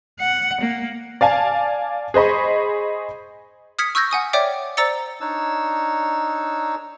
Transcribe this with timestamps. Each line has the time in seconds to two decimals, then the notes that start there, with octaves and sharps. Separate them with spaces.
0.20 F#5
0.61 A#3
1.21 D5 F5 G#5 A5
2.14 G#4 C5 D#5 B5 C#6
3.79 D#6 F6 G#6 B6 C#7
3.95 C#6 E6 F6 G6 G#6 A#6
4.11 F#5 G#5 D#6
4.33 C#5 D5 E5 G5 D6
4.77 C5 D5 A#5 E6 A6 C#7
5.21 D4 D#4 C#5 E6